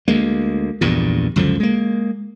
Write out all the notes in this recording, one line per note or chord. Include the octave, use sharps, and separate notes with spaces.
D2 G#3 A#3
A#1 E2 G2 A#2
C#2 F#2 D3 F3
G#3 A#3